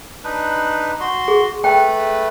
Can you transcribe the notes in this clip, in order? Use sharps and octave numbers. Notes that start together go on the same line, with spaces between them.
D4 D#4 B4
F#4 C6
G#4
A3 B4 G5